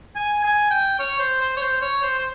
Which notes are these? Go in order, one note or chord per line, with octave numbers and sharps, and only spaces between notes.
G#5
G#5
G5
C#5
C5
C5
C#5
C5
C#5
C5
C5